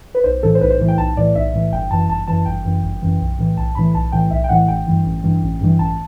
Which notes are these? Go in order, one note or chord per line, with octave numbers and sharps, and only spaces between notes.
B4
B1 C5
A2 E3 A4
C5
B1 B4
C5
A2 E3
G5
B1 A5
A2 E3 D5
B1 E5
A2 E3
G1 G5
F#2 E3 A5
G1 A5
F#2 E3 A5
G1 G5
F#2 E3
G1
F#2 E3
B1
A2 E3
B1 A5
A2 E3 B5
B1 A5
A2 E3 G5
B1 E5
G5
A2 E3 F#5
A1 G5
G2 E3
A1
G2 E3
A1
G2 E3
A1 A5